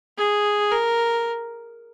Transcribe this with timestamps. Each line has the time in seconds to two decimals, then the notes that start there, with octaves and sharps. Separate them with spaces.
0.18 G#4
0.72 A#4